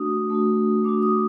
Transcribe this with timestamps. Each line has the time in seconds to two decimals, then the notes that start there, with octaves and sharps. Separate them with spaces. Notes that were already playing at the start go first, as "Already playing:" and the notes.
Already playing: A3 D4 F#4 D#6
0.30 A3 D4 F#4
0.84 A3 D4 F#4 D6
1.02 D#6